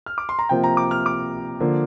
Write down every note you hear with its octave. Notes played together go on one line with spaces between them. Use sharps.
F6
D6
C6
A#5
C3 F3 A#3 G5
A#5
D6
F6
D6
D3 F3 A#3